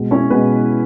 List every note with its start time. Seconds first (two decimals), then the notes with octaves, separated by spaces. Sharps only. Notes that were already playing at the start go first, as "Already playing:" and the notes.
Already playing: B2 G#3 B3
0.11 C#4 E4
0.30 B2 G#3 B3 B4